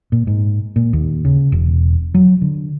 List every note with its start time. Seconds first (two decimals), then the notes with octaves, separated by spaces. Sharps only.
0.12 A#2
0.27 G#2
0.76 A#2
0.93 D#2
1.25 C#3
1.52 E1
2.14 F#3
2.42 D3